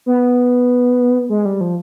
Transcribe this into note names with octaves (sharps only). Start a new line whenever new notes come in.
B3
G#3
G3
F3